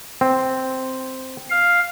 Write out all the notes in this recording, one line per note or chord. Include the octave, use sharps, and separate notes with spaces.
C4
F5